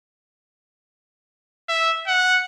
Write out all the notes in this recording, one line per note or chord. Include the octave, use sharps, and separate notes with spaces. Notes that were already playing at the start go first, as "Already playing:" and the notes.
E5
F#5